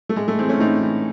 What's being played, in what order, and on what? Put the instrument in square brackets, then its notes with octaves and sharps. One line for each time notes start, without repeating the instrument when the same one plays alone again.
[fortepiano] A3
A2 G#3
A3
E3 G#3 C4
A3 C#4
A2 C4 D#4
E3